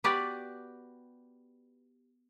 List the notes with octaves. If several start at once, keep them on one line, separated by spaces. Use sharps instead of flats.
B3 F#4 G4 B4 D5